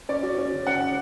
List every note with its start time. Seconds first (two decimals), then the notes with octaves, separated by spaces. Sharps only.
0.09 C#4 D5
0.23 F#4
0.38 C#4
0.52 C#3
0.67 C#4 F#5
0.81 C#3